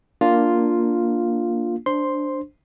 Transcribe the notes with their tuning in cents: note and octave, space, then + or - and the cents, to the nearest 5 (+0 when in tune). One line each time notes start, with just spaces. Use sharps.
A#3 +0 D4 +0 F4 +0
D4 +0 C5 +0 C6 +0